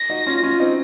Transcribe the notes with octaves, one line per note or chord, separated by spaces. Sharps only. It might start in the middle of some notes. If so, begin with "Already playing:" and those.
Already playing: A#6
D#4 F#4
C#4 F4
C#4 F4
C4 D#4